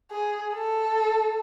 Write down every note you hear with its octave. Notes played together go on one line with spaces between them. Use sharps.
G#4
A4